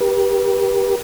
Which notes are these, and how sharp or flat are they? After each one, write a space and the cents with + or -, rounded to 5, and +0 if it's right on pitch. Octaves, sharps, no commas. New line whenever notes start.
G4 +0 B4 -45